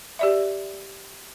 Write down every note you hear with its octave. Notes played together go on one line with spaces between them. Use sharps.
G4 D5 E5